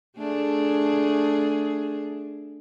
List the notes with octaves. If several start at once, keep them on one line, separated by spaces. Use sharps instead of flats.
A3 D4 G#4